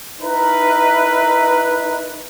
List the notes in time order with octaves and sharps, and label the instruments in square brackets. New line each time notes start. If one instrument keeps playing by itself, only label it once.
[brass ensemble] D#4 E4 A#4 B4